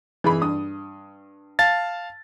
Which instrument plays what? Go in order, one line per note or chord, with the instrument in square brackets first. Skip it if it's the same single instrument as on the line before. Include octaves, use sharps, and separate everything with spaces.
[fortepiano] E3 G#4 B5
G2 D#6
[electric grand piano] F5 A5 A6